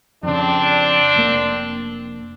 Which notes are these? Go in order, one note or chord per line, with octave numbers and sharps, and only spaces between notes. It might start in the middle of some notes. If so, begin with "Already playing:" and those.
F2 C#3 C4 D4
F1 A#3